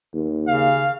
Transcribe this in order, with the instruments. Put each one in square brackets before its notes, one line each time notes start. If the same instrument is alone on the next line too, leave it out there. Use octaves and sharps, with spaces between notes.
[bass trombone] D#2
[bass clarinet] C#3 [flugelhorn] F5